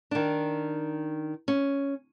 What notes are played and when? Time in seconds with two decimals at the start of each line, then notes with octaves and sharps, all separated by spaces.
0.11 D#3 D4
1.48 C#4